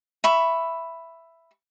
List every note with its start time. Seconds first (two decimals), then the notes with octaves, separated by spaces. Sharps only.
0.24 E5 B5 C#6